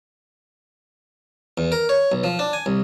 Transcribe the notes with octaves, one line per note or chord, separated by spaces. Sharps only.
E2
A#4
C#5
B1
F3
D4
G#5
C2